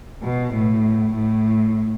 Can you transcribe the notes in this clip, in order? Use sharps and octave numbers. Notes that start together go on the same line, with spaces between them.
B2
A2
A2